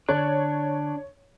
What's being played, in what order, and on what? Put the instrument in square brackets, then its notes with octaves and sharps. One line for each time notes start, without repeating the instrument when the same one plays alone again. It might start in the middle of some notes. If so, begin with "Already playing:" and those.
[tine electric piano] D3 F#6 [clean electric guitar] D4 [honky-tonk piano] C#5